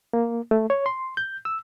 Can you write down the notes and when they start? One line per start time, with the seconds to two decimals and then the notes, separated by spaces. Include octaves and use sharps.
0.13 A#3
0.51 A3
0.70 C#5
0.86 C6
1.17 G6
1.45 E6